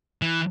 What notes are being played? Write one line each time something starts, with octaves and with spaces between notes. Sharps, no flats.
E3